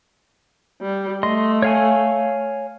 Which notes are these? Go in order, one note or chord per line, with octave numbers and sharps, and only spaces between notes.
G3
A3 D#5 C6
C#5 F5 G#5